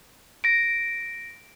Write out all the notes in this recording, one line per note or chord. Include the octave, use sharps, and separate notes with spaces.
A#6 D7